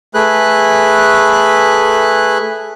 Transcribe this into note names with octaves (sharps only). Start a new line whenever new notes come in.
A3 G#4 B4 F#6